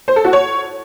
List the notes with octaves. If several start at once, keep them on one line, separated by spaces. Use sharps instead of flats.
C5
A4
F#4
C#5